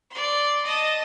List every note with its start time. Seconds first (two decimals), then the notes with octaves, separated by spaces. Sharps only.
0.10 D5 C6
0.65 D#5 A5